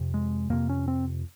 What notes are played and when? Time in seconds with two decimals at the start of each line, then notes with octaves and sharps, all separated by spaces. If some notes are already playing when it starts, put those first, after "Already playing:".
Already playing: F2 C3
0.14 G#3
0.50 F2 C3 A#3
0.69 C#4
0.88 C4